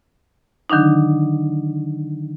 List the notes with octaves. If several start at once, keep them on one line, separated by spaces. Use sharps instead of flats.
D3 D#3 F#3 D4 D#4